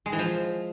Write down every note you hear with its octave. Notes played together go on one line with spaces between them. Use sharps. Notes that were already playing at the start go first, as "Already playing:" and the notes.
G#3
E3
F3